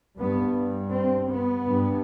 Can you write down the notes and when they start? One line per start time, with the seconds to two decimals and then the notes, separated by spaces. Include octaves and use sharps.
0.17 G2 B3
0.92 C4
1.29 B3
1.67 G2